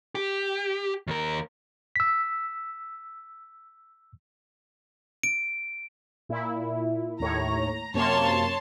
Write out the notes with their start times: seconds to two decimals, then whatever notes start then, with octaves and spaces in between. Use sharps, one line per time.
0.15 G4
1.07 D#2 A#4
1.96 E6 B6
5.23 D7
6.29 A#2 E4
7.20 D#2 A2 C#5 A#5
7.94 F#2 C3 A#3 C#5 A5 C6